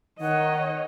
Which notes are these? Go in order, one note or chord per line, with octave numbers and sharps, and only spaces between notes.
D#3 C#5 D#5 F#5